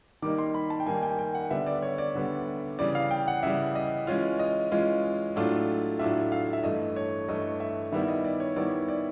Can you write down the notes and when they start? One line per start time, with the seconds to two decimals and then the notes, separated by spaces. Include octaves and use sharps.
0.22 D#3 G3 A#3 D#4 D6
0.38 C6
0.54 B5
0.70 A5
0.80 G5
0.86 D#3 G3 A#3 D#4 G#5
1.03 G5
1.19 G5
1.35 F#5
1.51 D3 G3 B3 E5
1.66 D5
1.82 C#5
1.98 D5
2.15 D3 G3 B3
2.79 C#3 E3 G3 D5
2.95 F5
3.11 G5
3.28 F#5
3.43 C#3 E3 G3 E5
3.75 D#5
4.07 E3 G#3 C#4 F4
4.39 D#5
4.71 E3 G#3 C#4 F4
5.36 A2 F#3 A3 D4 F4
5.99 A2 F#3 A3 D4 F4 E5
6.32 F5
6.53 E5
6.63 G2 E3 A3 D#5
6.96 C#5
7.28 G2 E3 A3 D#5
7.60 E5
7.92 D#3 G3 B3 E4 E5
8.08 D#5
8.24 D5
8.40 C#5
8.56 D#3 G3 B3 E4 D5
8.89 D5